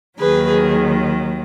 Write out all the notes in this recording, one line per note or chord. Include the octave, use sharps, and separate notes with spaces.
D#2 D#3 F#3 G#4 B4
G#4